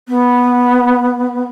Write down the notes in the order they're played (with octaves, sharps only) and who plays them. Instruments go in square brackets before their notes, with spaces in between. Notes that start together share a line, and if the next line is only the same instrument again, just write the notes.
[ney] B3